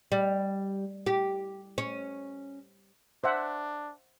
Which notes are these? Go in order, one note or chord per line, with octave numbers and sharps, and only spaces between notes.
G3
G4
C#4
D4 C5 E5 F#5